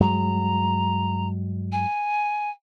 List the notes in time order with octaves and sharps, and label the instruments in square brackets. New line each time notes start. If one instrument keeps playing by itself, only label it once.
[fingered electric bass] G2 F#3 G#3 [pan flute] A#5
[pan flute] G#5